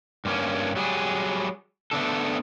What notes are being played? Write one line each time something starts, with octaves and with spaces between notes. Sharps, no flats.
G2 A#3 C#4
F#3 G3 G#4
A3 B3 D4 A4